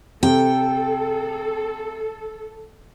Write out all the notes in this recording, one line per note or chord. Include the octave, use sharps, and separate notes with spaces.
C3 A4 G5